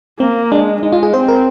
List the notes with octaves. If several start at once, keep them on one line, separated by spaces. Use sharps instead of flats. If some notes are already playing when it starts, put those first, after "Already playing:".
A#3 C4
G#3 D4
G#3 D#4
F4
G#4
C4 C5
A#4